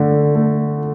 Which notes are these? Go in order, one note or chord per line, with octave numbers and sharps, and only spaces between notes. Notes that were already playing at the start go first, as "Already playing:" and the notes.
Already playing: D3 A3
A3